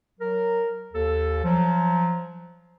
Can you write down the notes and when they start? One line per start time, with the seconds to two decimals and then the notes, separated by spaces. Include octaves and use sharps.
0.19 F#3 A#4
0.93 D#2 A4
1.44 F3 F#3